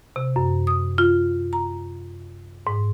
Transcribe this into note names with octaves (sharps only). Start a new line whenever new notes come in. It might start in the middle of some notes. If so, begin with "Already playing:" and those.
C3
F#2
D#6
F4
A#5
G#2